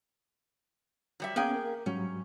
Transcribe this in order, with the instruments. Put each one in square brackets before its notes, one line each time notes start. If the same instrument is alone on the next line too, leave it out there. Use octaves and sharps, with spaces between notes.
[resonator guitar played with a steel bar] F#3 G3 E5
[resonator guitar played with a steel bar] A#3 G#4 G5 [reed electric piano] B3 C#4
[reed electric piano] A#4
[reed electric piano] G#2 F#3 G3 [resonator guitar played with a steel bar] C#4